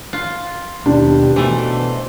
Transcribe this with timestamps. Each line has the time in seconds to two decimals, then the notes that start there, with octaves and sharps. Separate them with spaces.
0.13 F4
0.86 D#2 B2 D4 G4
1.36 B2 E3 A3 C5